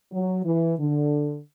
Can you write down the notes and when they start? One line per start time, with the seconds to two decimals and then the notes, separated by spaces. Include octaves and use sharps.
0.12 F#3
0.45 E3
0.79 D3